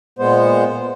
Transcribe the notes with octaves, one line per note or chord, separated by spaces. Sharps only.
A#2 G#3 B3 C5